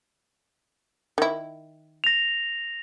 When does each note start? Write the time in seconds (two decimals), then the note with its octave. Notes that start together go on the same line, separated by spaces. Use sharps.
1.18 D#3 E4
2.04 A#6 F7